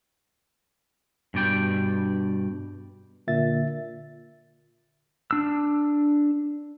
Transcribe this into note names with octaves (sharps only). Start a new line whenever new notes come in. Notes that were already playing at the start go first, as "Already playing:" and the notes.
G2 B2 D5 G5
A#2 D3 E5 A6
D4 E6